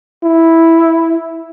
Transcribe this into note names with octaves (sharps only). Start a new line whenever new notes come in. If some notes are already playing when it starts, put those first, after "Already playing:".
E4